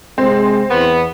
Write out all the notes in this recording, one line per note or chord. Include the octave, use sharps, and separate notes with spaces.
C3 G#3 C4
E2 B3